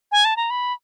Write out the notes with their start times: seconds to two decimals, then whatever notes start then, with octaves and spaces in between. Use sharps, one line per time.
0.12 G#5
0.25 A5
0.37 A#5
0.50 B5